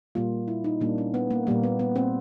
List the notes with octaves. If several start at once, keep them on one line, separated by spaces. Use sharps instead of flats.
A#2 G3 A#3 F4
E4
D#4
A#2 G3 A#3 D4
C#4
B3
A#3
A#2 G3 A#3
B3
B3
C4